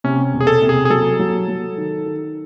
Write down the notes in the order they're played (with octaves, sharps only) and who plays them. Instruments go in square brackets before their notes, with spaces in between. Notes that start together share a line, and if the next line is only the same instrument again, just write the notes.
[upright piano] C3 [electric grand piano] C#4
[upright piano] E1
[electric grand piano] G#4
A4
[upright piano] C3
[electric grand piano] G#4
G#4
[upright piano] F#3 [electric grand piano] A4
[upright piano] F#3
F#3
D#3
D#3